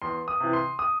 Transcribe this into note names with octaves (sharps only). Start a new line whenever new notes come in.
E2 C6
D#6
C3 E3
C6
D#6